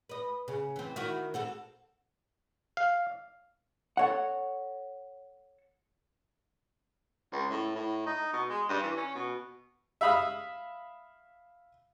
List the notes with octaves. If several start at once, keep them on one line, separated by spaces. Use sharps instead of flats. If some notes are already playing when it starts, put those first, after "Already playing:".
B4 D#5
C#3
E3 C4
D#3 E4 F#4
C4 F#4 A4
F5
A4 C#5 F#5
C#2
A2
A2
D#4
B2
G#3
G2
E3
C#4
B2
E5 F5 B5 D#6 E6